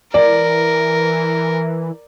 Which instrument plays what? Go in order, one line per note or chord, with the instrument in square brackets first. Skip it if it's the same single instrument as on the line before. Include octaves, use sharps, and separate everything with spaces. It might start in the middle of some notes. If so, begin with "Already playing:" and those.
[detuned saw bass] E3 [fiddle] A#4 [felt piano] D5